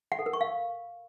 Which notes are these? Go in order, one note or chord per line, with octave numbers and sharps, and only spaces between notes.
F#5
A4
A#4
C#6
F5